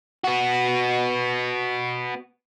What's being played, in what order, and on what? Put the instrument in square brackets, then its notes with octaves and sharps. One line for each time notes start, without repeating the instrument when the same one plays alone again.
[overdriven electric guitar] B3 F#4